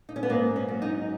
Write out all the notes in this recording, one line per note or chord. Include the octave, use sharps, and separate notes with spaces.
D#4
C#4
B3
G#2 A#3
C#4
F#3
D#4